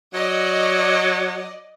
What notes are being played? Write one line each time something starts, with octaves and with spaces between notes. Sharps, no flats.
F#3 D5 D#5